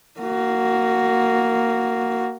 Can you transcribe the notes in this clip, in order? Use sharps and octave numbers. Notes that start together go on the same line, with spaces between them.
A#3 F#4